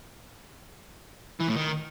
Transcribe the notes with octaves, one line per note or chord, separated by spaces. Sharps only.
E3
A2
D#3